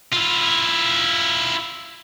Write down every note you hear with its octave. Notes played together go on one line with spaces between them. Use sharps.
E4 F4